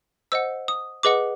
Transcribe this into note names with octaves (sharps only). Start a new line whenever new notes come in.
C5 D#5 F#5 E6
D#6
G#4 B4 D#5 F#5 D6